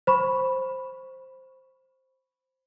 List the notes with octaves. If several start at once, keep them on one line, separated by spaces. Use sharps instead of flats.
C5 B5 C#6